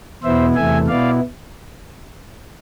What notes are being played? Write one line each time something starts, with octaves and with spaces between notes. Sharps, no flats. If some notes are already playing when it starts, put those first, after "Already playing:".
E2 B2 B3 E4 C5 E5
E2 C3 E3 A3 E5 G#5
B2 B3 E4 D5 F5